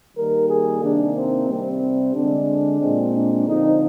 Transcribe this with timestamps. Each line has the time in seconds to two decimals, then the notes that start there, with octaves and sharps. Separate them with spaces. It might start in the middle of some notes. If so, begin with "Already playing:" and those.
0.15 D#3 G3 A#3 A#4
0.48 G#4
0.81 C3 D#3 A#3 D4
1.14 C4
1.47 C3 G3 C4
2.13 D3 G#3 C4 D4
2.80 A#2 G#3 C4
3.14 D4
3.47 D3 F3 C4 D#4